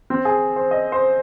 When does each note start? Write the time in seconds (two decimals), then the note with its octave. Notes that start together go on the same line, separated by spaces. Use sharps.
0.10 C4
0.25 G#4
0.56 C5
0.71 D#5
0.92 C5